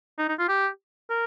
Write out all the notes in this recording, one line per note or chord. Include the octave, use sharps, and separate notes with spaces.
D#4
D#4
F4
G4
A#4